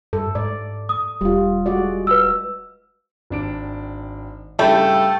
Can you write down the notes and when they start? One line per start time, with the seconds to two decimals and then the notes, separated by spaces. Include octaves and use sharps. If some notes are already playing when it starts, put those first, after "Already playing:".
0.13 G2 A4
0.35 G#2 D5
0.89 D#6
1.21 E1 G3 F4
1.66 G#3 F#4 D5
2.07 B4 E6
3.30 G#1 D4 D7
4.59 G2 C#3 A3 E4 A4 G5 B5